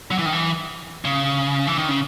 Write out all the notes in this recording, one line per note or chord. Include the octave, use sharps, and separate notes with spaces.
F#3
E3
D#3
E3
C#3
E3
D#3
C#3